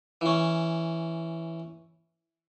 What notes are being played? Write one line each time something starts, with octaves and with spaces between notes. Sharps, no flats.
E3 C#4